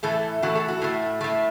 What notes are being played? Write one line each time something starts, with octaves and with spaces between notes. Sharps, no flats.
A2 E3 A3 A4
A2 E3 A3 F#4
A4
F#4
A2 A3
A2 A3